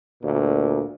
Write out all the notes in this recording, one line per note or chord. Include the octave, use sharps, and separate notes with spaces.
D2 A#2